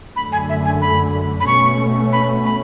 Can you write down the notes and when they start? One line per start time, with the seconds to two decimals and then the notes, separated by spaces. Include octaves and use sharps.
0.16 F#2 D3 A3 B5
0.32 G#5
0.49 E5
0.65 G#5
0.82 B5
1.40 B5
1.47 B2 A3 C#4 C#6
2.13 B5
2.45 B5